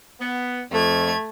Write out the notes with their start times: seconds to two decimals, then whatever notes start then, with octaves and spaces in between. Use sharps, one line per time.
0.20 B3
0.72 F2 A3 G#6